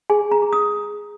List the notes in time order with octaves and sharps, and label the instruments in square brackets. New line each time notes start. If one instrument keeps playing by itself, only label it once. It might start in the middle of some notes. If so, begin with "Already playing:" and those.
[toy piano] G#4 G#5
A#5
G#4
D#6